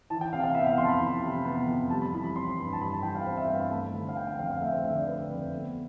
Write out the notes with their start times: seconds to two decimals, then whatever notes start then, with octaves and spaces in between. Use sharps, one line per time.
0.10 E3 A5
0.21 G5
0.33 C3 F5
0.44 F5
0.55 B3 E5
0.66 F5
0.77 F2 C6
0.84 A5
0.88 B5
1.01 E3
1.22 C3
1.45 B3
1.67 F2
1.90 G3 A5
2.02 B5
2.14 E3 B5
2.24 B5
2.35 C4 C6
2.59 G2
2.73 A5
2.81 G3 B5
2.92 A5
3.03 E3 G5
3.15 F5
3.26 C4 C5
3.37 E5
3.48 G2 F5
3.60 B5
3.71 A3 A5
3.93 D3
4.09 F5
4.16 C4 G5
4.27 G5
4.38 F2 F5
4.50 F5
4.61 A3 E5
4.72 C5
4.84 D3 E5
4.96 D5
5.07 C4 B4
5.29 F2
5.51 B3